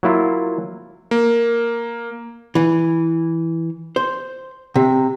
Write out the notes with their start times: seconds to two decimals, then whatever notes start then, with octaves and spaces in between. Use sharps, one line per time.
0.03 F#3 A#3 E4 F4
1.11 A#3
2.55 E3
3.96 C5
4.76 C3